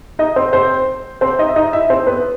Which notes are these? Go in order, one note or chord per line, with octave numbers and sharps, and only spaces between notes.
D#4 D#5
C4 C5
C4 C5
C4 C5
D#4 D#5
E5
D#4 D#5
E4 E5
C4 C5
B3 B4